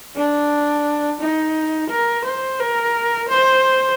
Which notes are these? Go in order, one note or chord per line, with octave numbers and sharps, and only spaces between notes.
D4
D#4
A#4
C5
A#4
C5